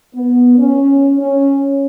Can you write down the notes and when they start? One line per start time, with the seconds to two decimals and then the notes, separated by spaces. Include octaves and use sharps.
0.14 B3
0.58 C#4
1.18 C#4